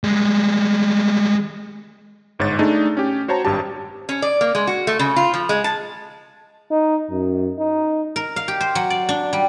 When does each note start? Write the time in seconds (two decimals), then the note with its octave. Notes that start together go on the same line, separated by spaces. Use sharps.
0.04 G3 G#3
2.39 G1 G#2 C#5 A6
2.59 A3 D4 D#4 G#4
2.97 C#4 G4
3.28 F#4 C5 C#5 A5 A#5
3.45 G#1 G2 G3 G4 A5
4.09 C#4
4.22 D5
4.41 A#3
4.55 G#3
4.67 F#4
4.87 A3
4.99 C#3
5.16 F4
5.34 F3
5.49 G#3
5.64 A5
6.71 D#4
7.10 F#2
7.59 D#4
8.16 A#4
8.36 F5
8.48 G4
8.61 C5
8.75 F#3
8.90 D5
9.09 D4
9.33 G3